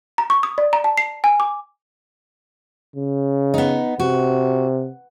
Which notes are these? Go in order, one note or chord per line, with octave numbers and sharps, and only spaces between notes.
A#5
C#6
D#6
D5
A#5
A5
C7
G#5
D6
C#3
B3 D#4
C3 F#4